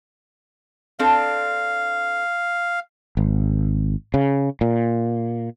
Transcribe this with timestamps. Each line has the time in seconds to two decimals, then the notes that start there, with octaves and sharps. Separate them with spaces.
0.99 C4 D4 A4 F5
3.17 G#1
4.14 C#3
4.61 A#2